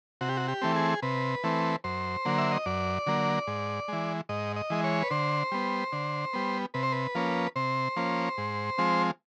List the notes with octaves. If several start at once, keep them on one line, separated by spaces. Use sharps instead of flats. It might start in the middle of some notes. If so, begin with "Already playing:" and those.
C3 F#4
G4
F#4
G4
E3 A3 C4
G#4
C3 B4
E3 A3 C4
F#2 C5
D3 F#3 A#3
E5
D#5
F#2 D5
D3 F#3 A#3
G#2
E3 G#3
G#2 D#5
D#5
E3 G#3
C#5
B4
D3 C5
G3 B3
D3
G3 B3
C3 B4
C5
B4
F3 A#3 C#4
C3 C5
F3 A#3 C#4
G#2
F3 G#3 C4